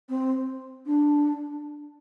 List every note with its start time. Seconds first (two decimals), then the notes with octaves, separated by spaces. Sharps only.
0.09 C4
0.86 D4